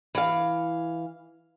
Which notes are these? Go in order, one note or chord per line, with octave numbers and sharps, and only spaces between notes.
E3 F5